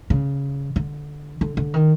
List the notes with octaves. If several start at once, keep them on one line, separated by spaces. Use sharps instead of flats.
C#3
D3
D3
D3
D#3